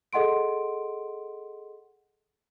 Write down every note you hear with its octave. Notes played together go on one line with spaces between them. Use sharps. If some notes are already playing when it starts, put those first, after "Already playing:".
G#4 A4 D#5 F#5 C6 D7